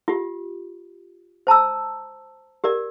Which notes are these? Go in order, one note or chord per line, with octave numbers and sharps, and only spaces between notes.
F4 G4
C5 A5 A#5 E6
G4 A#4 D5